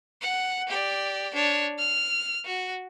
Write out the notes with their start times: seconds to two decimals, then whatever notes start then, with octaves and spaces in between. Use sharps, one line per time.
0.22 F#5
0.68 G4 D5
1.34 D4 C#5
1.79 F6
2.45 F#4